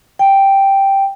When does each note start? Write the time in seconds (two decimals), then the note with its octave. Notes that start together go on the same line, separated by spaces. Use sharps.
0.19 G5